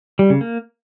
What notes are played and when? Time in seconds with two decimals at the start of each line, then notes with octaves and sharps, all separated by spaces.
0.19 G3
0.30 C#3
0.41 A#3